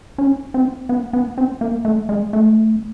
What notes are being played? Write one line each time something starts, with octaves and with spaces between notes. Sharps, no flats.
C#4
C4
B3
B3
C4
A#3
A3
G#3
A3